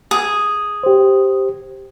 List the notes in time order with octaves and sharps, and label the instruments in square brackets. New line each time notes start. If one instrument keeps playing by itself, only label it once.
[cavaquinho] G#4
[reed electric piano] G4 C5